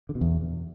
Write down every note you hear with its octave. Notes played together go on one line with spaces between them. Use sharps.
D3
B2
E2